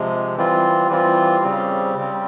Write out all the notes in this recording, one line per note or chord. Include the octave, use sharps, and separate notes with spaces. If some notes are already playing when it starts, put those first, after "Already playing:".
Already playing: C3 F3 G#3
E3 G3 C4 F4
E3 G3 C4 F4
C#3 G3 C4
C#3 G3 C4